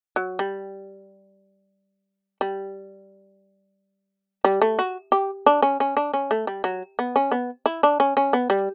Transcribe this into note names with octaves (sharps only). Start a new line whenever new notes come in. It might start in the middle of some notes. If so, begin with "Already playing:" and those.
F#3
G3
G3
G3
A3
F#4
G4
D4
C#4
C#4
D4
C#4
A3
G3
F#3
B3
C#4
B3
E4
D4
C#4
C#4
B3
G3